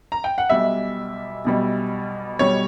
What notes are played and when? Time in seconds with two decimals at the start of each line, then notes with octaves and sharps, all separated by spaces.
0.12 A#5
0.24 G5
0.38 F#5
0.50 B1 B2 G3 E5
1.45 B1 B2 G3
2.39 B1 B2 G3 C#5